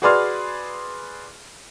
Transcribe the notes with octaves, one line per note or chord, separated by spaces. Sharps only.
F#4 G#4 B4 D5 C6 F6